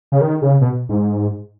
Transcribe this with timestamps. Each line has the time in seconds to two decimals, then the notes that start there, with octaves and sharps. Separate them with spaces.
0.12 C#3
0.21 D#3
0.42 C#3
0.61 B2
0.89 G#2